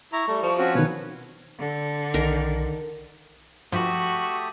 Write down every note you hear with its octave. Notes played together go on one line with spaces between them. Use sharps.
E4 A#5 C#6
G3 A3
F3
C4 C#4 F#4
B2 D#3 B4 C#5
D3
B1 D#3 A#4
G2 F3 A3 F#4 G4 B5 D#6